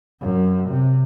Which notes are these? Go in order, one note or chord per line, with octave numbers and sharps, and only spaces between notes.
F#2
C3